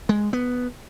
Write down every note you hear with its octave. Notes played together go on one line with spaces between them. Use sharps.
G#3
B3